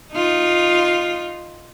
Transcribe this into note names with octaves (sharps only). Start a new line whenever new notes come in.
D#4 F4